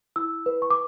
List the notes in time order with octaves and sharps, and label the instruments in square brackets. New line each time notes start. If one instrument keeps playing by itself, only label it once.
[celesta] E4 E6
B4
C#6
D6